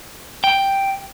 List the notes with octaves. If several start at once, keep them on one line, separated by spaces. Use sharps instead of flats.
G5